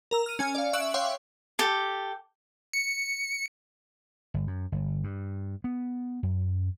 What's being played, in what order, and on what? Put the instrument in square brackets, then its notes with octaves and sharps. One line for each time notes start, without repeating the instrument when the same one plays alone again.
[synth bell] A#4 A#5 E6
F6 D#7
C#4 G#5 F6
D5 F5
E5 C#6 E6 F#6 D7 F#7
C#5 E5 F5 G5 C6 D6
[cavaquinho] G4 A4
[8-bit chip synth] C#7
[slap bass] G1
F#2
G1
G2
B3
F#2